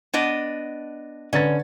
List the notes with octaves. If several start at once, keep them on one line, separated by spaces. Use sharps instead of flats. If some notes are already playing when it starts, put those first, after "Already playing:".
B3 D4 D#5
D3 C#4 B4 A6